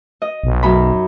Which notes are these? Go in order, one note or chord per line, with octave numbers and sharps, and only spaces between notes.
D#5
B1
F#2 D#4 B5